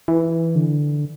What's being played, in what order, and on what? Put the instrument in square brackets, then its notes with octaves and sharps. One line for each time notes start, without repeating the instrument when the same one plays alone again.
[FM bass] E3
D3